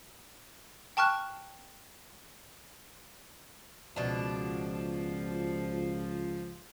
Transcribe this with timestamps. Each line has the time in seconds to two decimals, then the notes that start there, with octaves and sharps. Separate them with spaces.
0.97 G5 A5 C#6 F6 F#6
3.96 C#2 B2 F3 D4